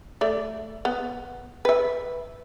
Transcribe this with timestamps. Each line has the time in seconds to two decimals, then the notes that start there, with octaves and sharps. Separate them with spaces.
0.21 A3 D5
0.85 B3
1.65 B4 E5